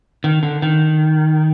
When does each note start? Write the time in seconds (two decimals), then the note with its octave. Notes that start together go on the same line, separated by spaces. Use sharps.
0.24 D#3
0.43 D3
0.62 D#3